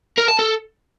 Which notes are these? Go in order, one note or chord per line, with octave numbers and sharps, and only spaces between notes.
A#4
A5
A4